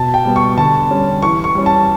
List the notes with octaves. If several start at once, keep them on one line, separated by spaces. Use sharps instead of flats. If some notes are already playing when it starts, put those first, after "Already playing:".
Already playing: B2 A5
G5
G3 B3
C#6
D3 A5
G3 C#4
E3 C#6
C#6
G3 C#4
A5